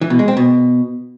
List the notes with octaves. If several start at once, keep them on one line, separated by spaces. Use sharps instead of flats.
E3
B2
G#3
C4
B2